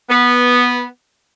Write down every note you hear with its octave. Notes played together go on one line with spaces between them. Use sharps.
B3